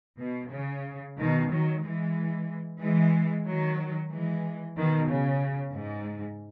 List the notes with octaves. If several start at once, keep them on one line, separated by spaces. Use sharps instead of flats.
B2
C#3
B2 D#3
D#3 F#3
E3 G#3
E3 G#3
D#3 F#3
E3 G#3
B2 D#3
C#3
G#2